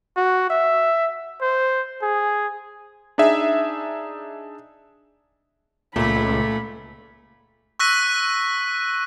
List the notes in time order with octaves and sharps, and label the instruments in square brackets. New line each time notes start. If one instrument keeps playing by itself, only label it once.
[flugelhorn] F#4
E5
C5
G#4
[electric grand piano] D4 D#4 G#4 E5
[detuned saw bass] C#2 [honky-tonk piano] A#2 [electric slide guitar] A3 [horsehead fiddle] B5
[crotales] C#6 E6 F#6 A#6 B6 D#7